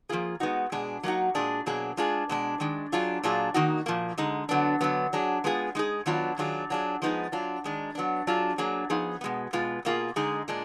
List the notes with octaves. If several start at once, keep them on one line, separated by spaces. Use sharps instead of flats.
F3 A#3 F4 G#4
G#3 B3 D#4 F#4
B2 G#3 D4 G#4
F#3 A#3 D#4 F#4
A#2 G#3 D4 G#4
B2 F#3 A#3 D4 G#4
G#3 D4 F4 G#4
B2 G#3 D4
D#3 G#3 D4
F#3 D4 F4 G#4
A#2 F#3 D4 F4 G#4
D#3 A#3 D#4 F#4
A#2 F3 A#3
D3 G#3 D#4
D3 F#3 B3 D4
D3 F#3 B3
F#3 D4 G#4
G#3 B3 F4 G#4
G#3 D#4 G#4
D#3 F#3 B3 D4 F4
D#3 F#3 D4 F4 G#4
F#3 D4 F4 G#4
F3 G#3 B3 D#4 G#4
F#3 D4 F4
D#3 G#3 D4
F#3 B3 D4
F#3 D4 F4 G#4
F#3 A#3 D4 G#4
F3 B3 D#4 G#4
B2 G#3 B3
B2 G#3 B3 F4
B2 A#3 F4 G#4
D3 G#3 D#4 G#4
A#2 G#3 D4